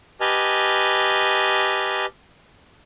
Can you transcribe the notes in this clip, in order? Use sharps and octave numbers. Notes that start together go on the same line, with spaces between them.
G4 B4 D#5 G#5 A5 F6